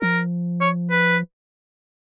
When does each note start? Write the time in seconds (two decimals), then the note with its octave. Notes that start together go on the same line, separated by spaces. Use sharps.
0.02 F3 A#4
0.61 C#5
0.91 B4